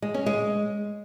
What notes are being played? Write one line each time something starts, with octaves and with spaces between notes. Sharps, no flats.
G#3
C#4
G#3